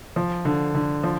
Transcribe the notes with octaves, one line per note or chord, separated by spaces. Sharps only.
F3
D3
D3
F3